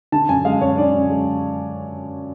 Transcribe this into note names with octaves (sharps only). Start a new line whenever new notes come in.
D3 A5
F#2 G#5
G#3 F5
F#2 C#5
D3 D5
F#2
G#3